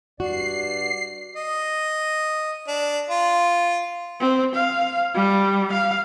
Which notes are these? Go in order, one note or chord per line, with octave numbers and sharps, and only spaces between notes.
G2 F#4 D5 C7
D#5
D4
F4
C4
F5
G3
F5